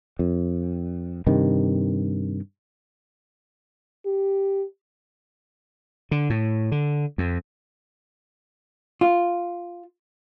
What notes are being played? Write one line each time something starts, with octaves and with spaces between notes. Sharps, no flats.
F2
G2 C3 D#3
G4
D3
A2
D3
F2
F4